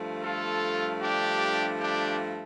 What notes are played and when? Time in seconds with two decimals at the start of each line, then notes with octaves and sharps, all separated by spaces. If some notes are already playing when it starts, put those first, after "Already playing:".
Already playing: G2 F3 A3
0.23 F4 A4
1.02 D4 G4
1.80 D4 G4